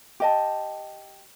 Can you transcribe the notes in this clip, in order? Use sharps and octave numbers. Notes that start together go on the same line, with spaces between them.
G4 D#5 A5